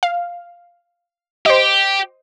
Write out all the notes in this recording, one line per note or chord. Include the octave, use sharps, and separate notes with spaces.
F5
G4 C5 D#5